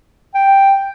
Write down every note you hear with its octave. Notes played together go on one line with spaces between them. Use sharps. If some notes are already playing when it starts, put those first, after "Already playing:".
G5